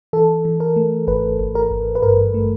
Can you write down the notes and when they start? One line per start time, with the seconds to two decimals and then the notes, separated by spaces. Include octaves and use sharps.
0.13 E3 A4
0.45 E3
0.60 A#4
0.76 A3
1.08 G#1 B4
1.39 G#1
1.55 A#4
1.71 G#1
1.95 B4
2.02 G2 A#4
2.34 A3